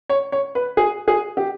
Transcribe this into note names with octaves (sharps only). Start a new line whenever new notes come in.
C#5
C#5
B4
G#4
G#4
G4